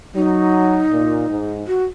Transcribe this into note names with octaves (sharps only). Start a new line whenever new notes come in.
F#3 D#4
A#2
G#2
F#4